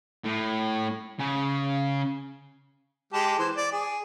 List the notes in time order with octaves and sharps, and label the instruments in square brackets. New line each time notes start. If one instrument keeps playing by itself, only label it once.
[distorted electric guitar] A2
C#3
[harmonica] G#3 G4 A5
E3 C5
D5
G#4